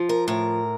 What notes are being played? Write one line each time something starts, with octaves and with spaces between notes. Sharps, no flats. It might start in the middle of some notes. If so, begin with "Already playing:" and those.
Already playing: F3
A#4
A2 A#4